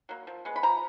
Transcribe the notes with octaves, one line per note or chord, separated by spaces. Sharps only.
F#3 A#3
F3
G#3 B3
B5
F3 A#5